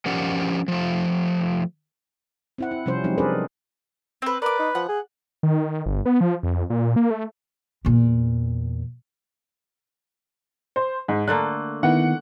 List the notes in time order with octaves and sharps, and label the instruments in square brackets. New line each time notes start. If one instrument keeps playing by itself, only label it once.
[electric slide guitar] F3 C#4 G4 A#4 D5 F#5
F3 A3
[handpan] C4 E4 F#5
E4
C3 F3 G3 C#4 C5
F3 F#3 G#3 C4 D#4
C4 D4 G#4 A#4 B4 D5
[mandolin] C4 B4
[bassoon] A#4 [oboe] B4 [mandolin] D5 D6
[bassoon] D#4
[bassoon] F3 [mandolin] F#5
[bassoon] G#4
[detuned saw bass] D#3
G1
B3
F3
F2
A#2
A#3
A3
[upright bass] E2 A#2
[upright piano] C5
G#2
[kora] D3 A3 A#3 [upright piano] F#6
[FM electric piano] D#3 B3 E4 [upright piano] F#5